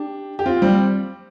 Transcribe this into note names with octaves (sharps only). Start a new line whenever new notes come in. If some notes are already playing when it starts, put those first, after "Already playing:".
Already playing: D4 G4
G4
C4 F4
G3 C4